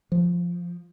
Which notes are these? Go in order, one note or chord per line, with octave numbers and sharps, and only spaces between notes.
F3